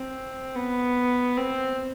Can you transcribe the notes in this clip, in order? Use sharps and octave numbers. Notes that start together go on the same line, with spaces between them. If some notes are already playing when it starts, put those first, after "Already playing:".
Already playing: C4
B3
C4